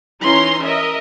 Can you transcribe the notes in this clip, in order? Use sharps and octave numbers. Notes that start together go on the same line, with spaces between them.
E3 C#4 D#4 A#5 C6
A#4 D#5 E5